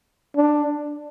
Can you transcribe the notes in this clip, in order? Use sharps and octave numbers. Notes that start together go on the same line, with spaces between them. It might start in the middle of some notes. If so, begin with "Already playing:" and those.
D4